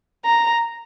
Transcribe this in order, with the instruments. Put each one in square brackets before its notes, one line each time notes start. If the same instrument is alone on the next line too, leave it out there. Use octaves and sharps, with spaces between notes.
[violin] A#5